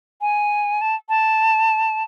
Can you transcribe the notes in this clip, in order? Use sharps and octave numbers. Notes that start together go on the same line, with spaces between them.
G#5
A5
A5